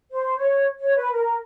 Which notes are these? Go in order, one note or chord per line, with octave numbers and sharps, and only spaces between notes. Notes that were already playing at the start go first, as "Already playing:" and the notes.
C5
C#5
C#5
B4
A#4